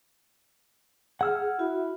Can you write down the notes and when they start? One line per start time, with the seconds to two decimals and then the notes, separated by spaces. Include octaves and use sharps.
1.21 G#4 F#5 E6 F6
1.59 E4 F#4